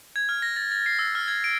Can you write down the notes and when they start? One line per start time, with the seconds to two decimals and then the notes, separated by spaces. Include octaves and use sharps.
0.16 G#6
0.29 F6
0.42 A#6
0.56 A6
0.71 A6
0.86 C7
0.99 E6
1.15 F6
1.28 G#6
1.44 D7